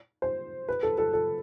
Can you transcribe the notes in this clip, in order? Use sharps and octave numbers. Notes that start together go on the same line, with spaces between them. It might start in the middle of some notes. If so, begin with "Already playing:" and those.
C5
B4
A4
A4
A4